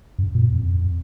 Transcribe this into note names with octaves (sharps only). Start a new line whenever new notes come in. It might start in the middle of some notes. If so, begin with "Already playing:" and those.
F#2
A#2
F2